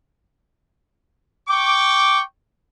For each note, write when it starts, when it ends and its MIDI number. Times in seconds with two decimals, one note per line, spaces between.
1.48 2.22 79
1.48 2.22 85
1.48 2.22 86